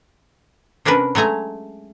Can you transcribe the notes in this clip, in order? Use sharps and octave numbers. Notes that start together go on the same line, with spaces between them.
C3 C#4 D4 A#4 B4
F#3 G#3 A3 G#5 A#5